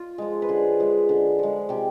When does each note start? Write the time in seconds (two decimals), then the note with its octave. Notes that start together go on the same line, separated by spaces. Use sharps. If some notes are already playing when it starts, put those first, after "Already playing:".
Already playing: F4
0.18 F3 G#3
0.42 B4
0.49 D3 G#4
0.80 F3 G#3
1.09 D3
1.39 F3 G#3
1.69 C3 G4